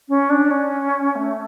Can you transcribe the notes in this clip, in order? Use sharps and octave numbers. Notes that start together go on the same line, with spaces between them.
C#4
D4
C#4
A3